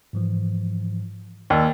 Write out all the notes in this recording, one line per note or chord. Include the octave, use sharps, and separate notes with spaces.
G#2 E3 F3
D#2 D5 E6 A6